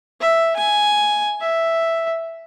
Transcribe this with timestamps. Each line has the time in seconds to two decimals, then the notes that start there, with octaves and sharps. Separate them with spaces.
0.21 E5
0.56 G#5
1.41 E5